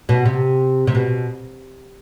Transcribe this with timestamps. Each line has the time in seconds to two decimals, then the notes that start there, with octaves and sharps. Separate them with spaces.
0.09 B2
0.25 C3
0.87 C3
0.95 B2